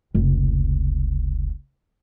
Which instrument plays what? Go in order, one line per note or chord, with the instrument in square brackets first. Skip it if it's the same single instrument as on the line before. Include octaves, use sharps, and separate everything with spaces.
[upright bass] F1 C#2